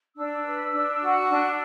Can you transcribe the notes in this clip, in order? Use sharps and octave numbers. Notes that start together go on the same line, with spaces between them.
D4 E6
B4
D4
F#4
D4